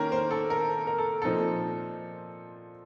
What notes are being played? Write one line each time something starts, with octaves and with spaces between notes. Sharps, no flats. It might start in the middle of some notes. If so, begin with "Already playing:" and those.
Already playing: D#3 A#3 C#4 A#4
C5
A4
A#4
A#4
A4
A#2 F3 C4 D#4 A4